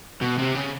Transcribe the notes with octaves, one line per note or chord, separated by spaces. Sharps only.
B2
C3
C#3